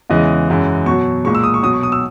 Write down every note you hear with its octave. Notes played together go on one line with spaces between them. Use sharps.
E2 C#3 E3 G#3 D#5
F#2 E3 G#3
B2 F#3 C#6
A#2 G#3 C#6
E6
D#6
C#6
B2 F#3 D#6
C#6
D#6
E6